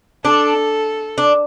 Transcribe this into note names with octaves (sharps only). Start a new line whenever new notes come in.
D4 A4
D4